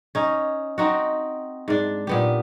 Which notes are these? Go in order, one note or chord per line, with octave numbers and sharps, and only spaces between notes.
C#4 D#4
C4 D#4 F#4
G#2 D4
A#2 B3 G4